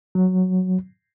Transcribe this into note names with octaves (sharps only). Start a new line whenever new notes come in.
F#3